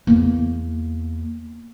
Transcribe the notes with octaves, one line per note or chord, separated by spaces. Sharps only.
E2 A#3